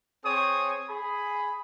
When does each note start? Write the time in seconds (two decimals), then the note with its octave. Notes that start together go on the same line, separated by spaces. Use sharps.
0.24 C4 G#4 C#5 D#6
0.89 G#4 B5